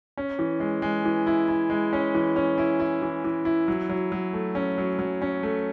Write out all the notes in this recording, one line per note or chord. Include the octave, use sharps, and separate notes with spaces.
C#4
E3
G#3
G#3
E3
E4
E4
G#3
C#4
E3
C#4
E4
E4
E3
E3
E4
F#3
F#3
F#3
A3
C#4
F#3
F#3
C#4
A3